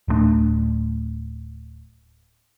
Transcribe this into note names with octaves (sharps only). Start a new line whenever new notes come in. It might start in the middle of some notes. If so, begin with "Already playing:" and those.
D1 G2 A3 D4